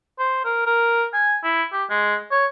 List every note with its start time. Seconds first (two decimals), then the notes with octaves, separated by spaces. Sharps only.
0.19 C5
0.45 A#4
0.67 A#4
1.14 G#5
1.44 E4
1.72 G4
1.90 G#3
2.31 C#5